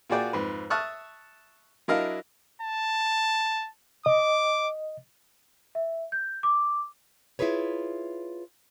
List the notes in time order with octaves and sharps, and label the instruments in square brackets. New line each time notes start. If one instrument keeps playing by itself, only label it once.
[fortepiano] A#2 F#4 G#4 D5 G5
F2 G#2 B4
E5 A5 C#6 D#6 F6 F#6
F#3 D4 E4 A#4 D#5 F5
[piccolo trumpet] A5
[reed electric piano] D#5 [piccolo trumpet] D6
[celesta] E5
G6
D6
[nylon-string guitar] E4 F4 G#4 B4 C#5